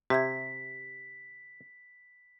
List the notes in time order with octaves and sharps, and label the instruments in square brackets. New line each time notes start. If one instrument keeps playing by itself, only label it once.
[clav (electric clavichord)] C3 [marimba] G4 E5 G#6 [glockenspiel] B6